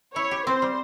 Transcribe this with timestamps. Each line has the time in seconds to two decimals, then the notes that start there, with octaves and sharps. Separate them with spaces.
0.15 E4 C#5
0.31 G4
0.46 C4 C5
0.62 G3